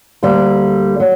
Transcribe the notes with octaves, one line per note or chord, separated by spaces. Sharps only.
D2 D3 G3 A#3
F#3